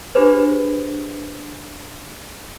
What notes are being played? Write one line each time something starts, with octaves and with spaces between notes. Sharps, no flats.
D4 F4 G4 G#4 B4 C5